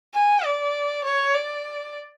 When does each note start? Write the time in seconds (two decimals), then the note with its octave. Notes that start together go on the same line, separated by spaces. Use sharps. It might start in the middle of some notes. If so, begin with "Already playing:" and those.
0.14 G#5
0.44 D5
1.04 C#5
1.34 D5